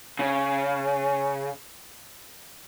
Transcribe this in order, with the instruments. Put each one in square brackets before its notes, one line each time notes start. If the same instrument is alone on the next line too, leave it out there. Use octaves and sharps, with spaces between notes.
[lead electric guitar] C#3